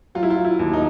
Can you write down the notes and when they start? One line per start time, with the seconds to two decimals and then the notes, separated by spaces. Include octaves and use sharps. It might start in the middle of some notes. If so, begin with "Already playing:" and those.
0.15 F#3 F4
0.23 E4
0.30 F4
0.45 E4
0.59 D#2
0.73 D#4